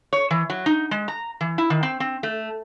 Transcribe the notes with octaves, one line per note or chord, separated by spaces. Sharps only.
C#5
E3
F#3
D#4
G#3
A#5
E3
E4
D#3
C4
C4
A3